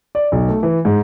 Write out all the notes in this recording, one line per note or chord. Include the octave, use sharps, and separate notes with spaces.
D5
B1
A3
E3
G#2